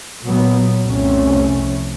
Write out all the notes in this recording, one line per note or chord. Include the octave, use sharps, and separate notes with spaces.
A#2 F#3 B3
C2 F2 C3 A3 C#4